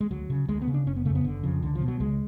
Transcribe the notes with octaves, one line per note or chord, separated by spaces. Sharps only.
G#3
D2 F#3
C#3
D2 G#3
B3
C#3
D4
F#1 C#4
B3
F2 C#3 A3
B3
F#1 D3
F2 C#3 F3
C#2 D3
F3
B2
F#3
C#2 G#3